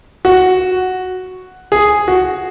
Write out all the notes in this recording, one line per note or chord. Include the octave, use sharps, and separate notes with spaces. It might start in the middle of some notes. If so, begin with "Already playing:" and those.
F#4
G#4
F#4